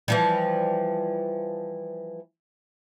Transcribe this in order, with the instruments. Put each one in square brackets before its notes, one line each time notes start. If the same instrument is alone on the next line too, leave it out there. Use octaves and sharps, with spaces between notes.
[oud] E3 F3 G3